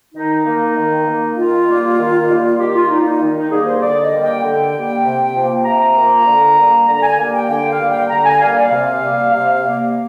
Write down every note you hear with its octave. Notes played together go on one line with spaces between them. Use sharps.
D#3 D#4
A#3
D#3
A#3
D#3 F4
G3 A#3
D#3
G3 A#3
D#3 G4
F4
G3 A#3 D#4
D#4
D#3
D#4
G3 A#3 G#4
C5
D3 D5
D#5
G3 A#3
G5
D3 G5
G3 A#3
C3
F3 A#3
C3 A#5
F3 A#3
D3
G3 A#3
D3 A#5
G#5
G3 A#3 G#5
G5
D3 G5
F5
G3 A#3
G5
D3 A#5
G#5
G3 A#3 F5
D5
C3 F5
G3 A#3
C3
G3 A#3